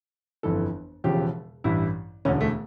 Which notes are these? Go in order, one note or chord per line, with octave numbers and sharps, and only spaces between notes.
G1 F2 E3 A4
E1 E2 C#3 F3 G4
A1 G2 E3 E4
E1 D2 D3 C#4
A3